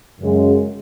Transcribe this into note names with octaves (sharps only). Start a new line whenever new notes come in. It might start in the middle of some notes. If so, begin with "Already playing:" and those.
F#2 C#3 G#3